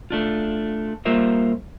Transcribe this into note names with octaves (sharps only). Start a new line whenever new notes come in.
A3 D4 F4
G3 A#3 F4 A#4 C5 E5